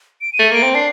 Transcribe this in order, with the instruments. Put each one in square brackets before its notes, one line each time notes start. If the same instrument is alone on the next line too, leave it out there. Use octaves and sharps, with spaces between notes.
[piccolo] D7
D#7
[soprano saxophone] A3
[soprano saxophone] A#3 [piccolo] D7
[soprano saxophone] C4
[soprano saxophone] D4 [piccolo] C7